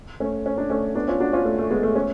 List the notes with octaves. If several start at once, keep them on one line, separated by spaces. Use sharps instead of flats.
A3 C#4
C#4
D4
A3 C#4
B3 D4
C#4 F4
D4 F#4
C#4 F4
A3
A3
G#3 B3
A3
A3 C#4